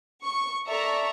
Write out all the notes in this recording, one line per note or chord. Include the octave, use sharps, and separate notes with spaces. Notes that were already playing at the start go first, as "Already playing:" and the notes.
C#6
A4 D5 E5 A#5 C#6